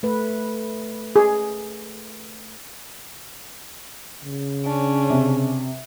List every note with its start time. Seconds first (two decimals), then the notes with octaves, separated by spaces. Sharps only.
0.03 A3 B4
1.16 G#4
4.24 C#3
4.64 C#4 D4
5.10 C3